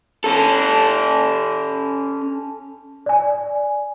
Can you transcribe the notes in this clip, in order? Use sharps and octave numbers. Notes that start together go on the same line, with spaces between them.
C#4 A4
D5 G#5